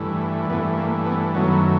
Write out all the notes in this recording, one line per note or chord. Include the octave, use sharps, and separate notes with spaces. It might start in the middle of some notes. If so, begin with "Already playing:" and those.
Already playing: G2 E3 A3
G2 E3 A3 B3
A#3
B3
F#2 D#3 F#3 A3 B3